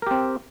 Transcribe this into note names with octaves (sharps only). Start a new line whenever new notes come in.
C4 G4 A#4